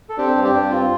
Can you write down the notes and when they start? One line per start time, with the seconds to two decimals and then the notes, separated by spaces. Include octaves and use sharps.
0.09 A4
0.17 C4 D4 G4
0.35 G2
0.44 D4 G4
0.53 G2
0.71 C4 F4